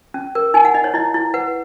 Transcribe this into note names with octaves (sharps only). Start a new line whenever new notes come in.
C#4
A#4
D#4 G#5
F#5
D#4 D#5
C#5
E4 D#5
E4
B4 F#5